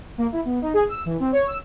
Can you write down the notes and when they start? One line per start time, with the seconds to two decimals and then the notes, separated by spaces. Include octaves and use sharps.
0.18 A#3
0.32 E4
0.45 B3
0.62 D#4
0.74 G#4
0.89 E6
1.06 E3
1.20 C4
1.32 C#5
1.47 E6